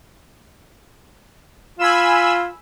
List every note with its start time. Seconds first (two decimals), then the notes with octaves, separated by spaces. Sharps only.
1.79 F4 G#5 B5 E6